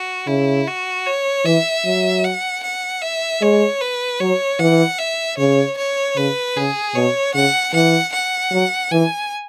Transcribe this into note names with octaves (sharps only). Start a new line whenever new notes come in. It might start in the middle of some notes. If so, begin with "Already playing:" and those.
Already playing: F#4
C#3 E4
F#4
C#5
E3 E5
F#3
F#5
F#5
E5
G#3 C#5
B4
F#3 C#5
E3 F#5
E5
C#3 C#5
C#5
C#3 B4
C#3 G#4
B2 C#5
C#3 F#5
E3 F#5
F#5
F#3
E3 G#5